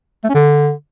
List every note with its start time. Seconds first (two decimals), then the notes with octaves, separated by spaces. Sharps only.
0.24 A3
0.29 C#4
0.34 D3